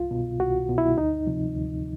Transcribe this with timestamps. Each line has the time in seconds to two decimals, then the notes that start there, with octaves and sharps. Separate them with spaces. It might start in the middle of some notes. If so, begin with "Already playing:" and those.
Already playing: C2 F4
0.11 B2
0.40 C2 F#4
0.69 B2
0.78 E4
0.98 D2 D#4
1.27 C3 F3
1.56 D2